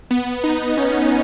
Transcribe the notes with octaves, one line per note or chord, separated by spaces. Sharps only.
B3
D#4
C#4